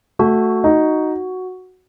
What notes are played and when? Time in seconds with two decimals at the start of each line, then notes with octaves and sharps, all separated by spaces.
0.19 A3 F#4
0.64 D#4